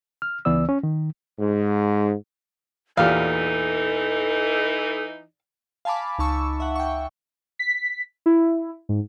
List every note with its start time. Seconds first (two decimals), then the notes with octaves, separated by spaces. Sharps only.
0.22 F6
0.45 C#2 E3 B3 D5 E6
0.69 C#4
0.83 D#3
1.39 G#2
2.97 E2 A#2 E3 D#4 G4 A4 F5
5.85 F5 G#5 A5 B5 D6
6.19 C#2 D#4 A5 C#6 E6
6.60 E5 F#5
6.76 G5 C#6
7.59 B6
8.26 E4
8.89 G#2